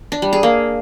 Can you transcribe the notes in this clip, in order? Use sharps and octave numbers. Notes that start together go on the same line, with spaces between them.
D4
G3
G#4
A#3